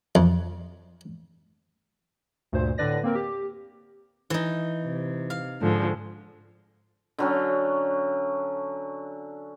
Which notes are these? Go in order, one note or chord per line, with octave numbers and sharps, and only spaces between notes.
F2
D2 G2 A#2 C5
A2 D3 D4 B4 D5 A#6
A#3 C4 A#4
G4
E3 D#4
C3
F5
G#2 D3 F3
D3 F#3 C#4